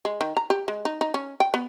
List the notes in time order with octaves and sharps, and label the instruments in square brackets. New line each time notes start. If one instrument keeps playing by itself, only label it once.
[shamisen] G#3
D#3
A#5
G4
G#3
D#4
D#4
C#4
G5
B3